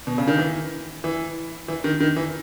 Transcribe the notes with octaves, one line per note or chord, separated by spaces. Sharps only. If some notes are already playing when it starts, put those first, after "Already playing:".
B2
C#3
D#3
E3
E3
E3
D#3
D#3
E3